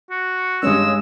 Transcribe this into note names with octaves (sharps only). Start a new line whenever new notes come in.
F#4
G2 G#3 C#4 E6